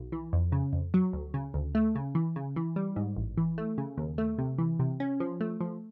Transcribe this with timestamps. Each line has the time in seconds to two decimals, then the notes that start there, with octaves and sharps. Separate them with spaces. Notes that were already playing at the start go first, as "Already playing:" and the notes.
Already playing: B1
0.12 E3
0.33 F2
0.52 C#3
0.73 F2
0.94 F#3
1.13 D2
1.34 C#3
1.54 D2
1.75 A3
1.95 C#3
2.15 E3
2.36 C#3
2.56 E3
2.76 G3
2.96 G#2
3.17 A1
3.37 E3
3.58 A3
3.78 C#3
3.97 D#2
4.18 A3
4.39 C3
4.58 E3
4.79 C3
5.00 C#4
5.20 F3
5.41 A3
5.61 F3